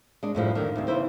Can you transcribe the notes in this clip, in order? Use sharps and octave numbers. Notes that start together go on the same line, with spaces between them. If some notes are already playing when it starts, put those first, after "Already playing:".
G#3 D4
F#2 A2 F3 G3
D3 D#3
D2 C3
C#3 E3 B3 E4 C5